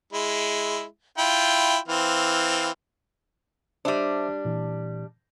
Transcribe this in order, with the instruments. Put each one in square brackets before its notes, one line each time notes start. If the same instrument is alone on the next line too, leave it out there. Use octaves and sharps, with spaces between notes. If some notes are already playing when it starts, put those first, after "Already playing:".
[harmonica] G#3 E4
E4 F4 G5
E3 C4 F5
[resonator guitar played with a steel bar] G3 D4 [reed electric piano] C5 E5 D6
[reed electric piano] A#2 E3